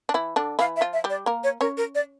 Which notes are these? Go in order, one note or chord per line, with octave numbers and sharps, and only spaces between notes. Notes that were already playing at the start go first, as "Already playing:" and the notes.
D4
E3 E4
D3 D4
E3 E4 F5
E5
F3 F4
E5
G3 G4
D5
A#3 A#4
C#5
C#4 A#4 C#5
A#4
D5